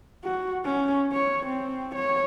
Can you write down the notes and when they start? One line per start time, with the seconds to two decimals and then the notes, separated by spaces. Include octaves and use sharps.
0.24 F#4
0.65 C#4
1.12 C#5
1.46 C4
1.95 C#5